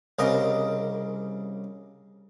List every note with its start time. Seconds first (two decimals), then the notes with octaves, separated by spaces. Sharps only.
0.19 C2 C#3 A#4 D#5